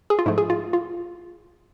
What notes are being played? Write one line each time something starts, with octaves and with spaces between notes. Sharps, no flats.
G#4
F4
G#2 F3 A3 E4
G#4
F4
F4